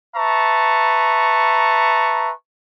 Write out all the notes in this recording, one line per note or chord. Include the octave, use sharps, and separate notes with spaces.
B4 E5 A5 A#5 C#6